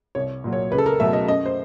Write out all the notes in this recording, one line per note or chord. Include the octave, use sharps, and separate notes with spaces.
C2 C#5
A#2 F#3
C#5
C#2 B4
A4
A#4
B2 F#3 A3 E5
D#5
F#2 D#5
C5